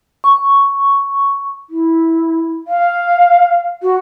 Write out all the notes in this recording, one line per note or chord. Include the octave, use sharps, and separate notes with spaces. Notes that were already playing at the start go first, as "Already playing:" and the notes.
C#6
E4
F5
F#4